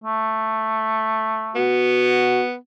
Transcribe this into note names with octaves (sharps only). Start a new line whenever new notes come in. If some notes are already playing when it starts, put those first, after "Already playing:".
A3
B3 F#4